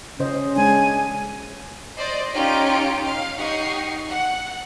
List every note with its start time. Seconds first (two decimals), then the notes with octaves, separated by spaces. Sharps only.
0.20 C#3 C#4 C5 D#5
0.56 G#3 D4 G#5
1.97 C5 D5 D#5
2.32 C#4 D#4 F4 G4 D7
3.07 F5
3.37 D#4 G4 F#5 C#6 C7
4.09 F#5